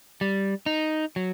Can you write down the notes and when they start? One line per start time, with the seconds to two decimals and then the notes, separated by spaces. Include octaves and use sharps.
0.21 G3
0.66 D#4
1.16 F#3